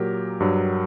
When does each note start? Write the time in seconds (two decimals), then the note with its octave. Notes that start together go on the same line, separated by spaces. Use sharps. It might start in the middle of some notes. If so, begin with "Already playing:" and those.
Already playing: A#2 F#3 G4 A#4
0.40 G2 F#3